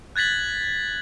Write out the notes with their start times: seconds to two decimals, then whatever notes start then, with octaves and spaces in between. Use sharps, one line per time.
0.16 F#6 G#6 A6 B6 F#7